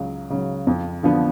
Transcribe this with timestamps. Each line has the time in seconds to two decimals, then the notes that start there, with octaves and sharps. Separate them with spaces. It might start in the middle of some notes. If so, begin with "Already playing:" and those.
Already playing: C#2 C#3 F#3
0.30 C#3 F#3
0.67 F2
1.03 D3 F3 B3 D4